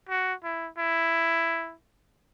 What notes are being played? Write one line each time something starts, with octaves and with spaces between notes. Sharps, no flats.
F#4
E4
E4